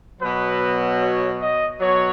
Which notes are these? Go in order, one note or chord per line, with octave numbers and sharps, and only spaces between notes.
B2 F#3 B4
C#5
D#5
B2 F#3 C#5